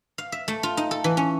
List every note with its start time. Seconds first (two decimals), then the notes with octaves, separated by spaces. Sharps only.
0.18 F5
0.32 E5
0.48 A3
0.63 F4
0.77 D#4
0.91 A4
1.04 E3
1.17 C#4